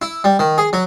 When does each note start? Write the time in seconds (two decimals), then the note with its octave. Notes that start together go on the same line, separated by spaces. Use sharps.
0.02 E4
0.24 G3
0.39 D#3
0.58 G#4
0.73 F#3